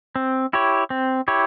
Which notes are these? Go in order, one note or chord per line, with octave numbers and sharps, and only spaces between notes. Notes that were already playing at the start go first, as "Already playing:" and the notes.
C4
E4 G4 C#5
C4
E4 G4 C#5